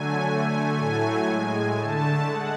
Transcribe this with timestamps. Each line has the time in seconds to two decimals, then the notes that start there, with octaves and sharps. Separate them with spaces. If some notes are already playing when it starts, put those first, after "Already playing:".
Already playing: D3 F#3 A3 G#5
0.27 D3 A3 G#5
0.77 A2 F#3 A3 G#5
1.27 A2 G#3 G#5
1.76 D3 A3 A5
2.26 G#3 F#5